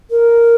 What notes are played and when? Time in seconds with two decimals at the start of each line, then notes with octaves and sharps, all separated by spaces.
0.10 A#4